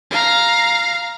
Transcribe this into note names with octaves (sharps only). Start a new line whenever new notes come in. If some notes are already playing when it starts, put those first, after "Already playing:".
F5 A#5